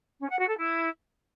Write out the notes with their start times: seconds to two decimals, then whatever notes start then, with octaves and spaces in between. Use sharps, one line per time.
0.21 C#4
0.30 F#5
0.39 F#4
0.48 A4
0.57 E4